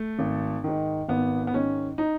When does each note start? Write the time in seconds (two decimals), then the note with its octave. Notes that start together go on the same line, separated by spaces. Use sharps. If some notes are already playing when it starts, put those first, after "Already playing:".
Already playing: A3
0.19 G#1
0.64 G#2 D#3
1.08 G#1 B3
1.47 B3
1.54 G#2 D#3 C#4
1.98 D#4